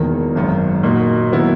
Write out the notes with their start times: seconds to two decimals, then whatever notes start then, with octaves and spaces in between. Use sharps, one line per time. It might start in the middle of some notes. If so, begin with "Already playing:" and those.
Already playing: E1 E2 D#3 A#3
0.36 G#1 F#2 D#3
0.83 A#2 A#3 D#4 F#4
1.32 D#3 F#3 B3 E4